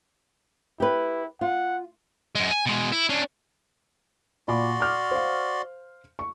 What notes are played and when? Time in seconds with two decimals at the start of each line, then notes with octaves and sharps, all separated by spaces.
0.80 E4 G4 B4
1.41 F4 F#5
2.35 F#2 G#3
2.51 G#5
2.66 B2 G#3
2.92 E4
3.09 C#4 D4
4.48 A#2 F#4 D5 B5 C6 D6
4.80 D6 F6
5.11 C5 F5
6.19 C#6